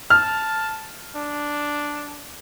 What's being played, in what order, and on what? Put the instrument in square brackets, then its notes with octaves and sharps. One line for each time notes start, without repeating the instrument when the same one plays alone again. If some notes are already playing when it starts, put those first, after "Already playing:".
[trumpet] A5 [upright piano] F6
[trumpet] D4